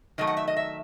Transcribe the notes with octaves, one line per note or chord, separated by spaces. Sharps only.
D#3 F#3 A3 D#5
F#5
E5
D#5
E5